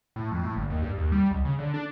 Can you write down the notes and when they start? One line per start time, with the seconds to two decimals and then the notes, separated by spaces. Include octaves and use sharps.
0.16 A2
0.31 F2
0.43 A2
0.56 G1
0.70 D#2
0.82 G2
0.98 D#2
1.12 G3
1.31 C#2
1.45 C#3
1.59 D3
1.74 D4